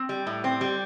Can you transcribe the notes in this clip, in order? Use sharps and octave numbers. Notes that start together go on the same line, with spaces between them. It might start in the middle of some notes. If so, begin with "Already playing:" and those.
Already playing: C4
G3
A2
C4
G3